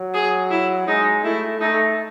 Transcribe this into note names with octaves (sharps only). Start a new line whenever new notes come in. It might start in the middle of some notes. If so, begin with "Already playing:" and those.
Already playing: F#3
G#4
E4
G#3 D#4
A3 E4
A3 D#4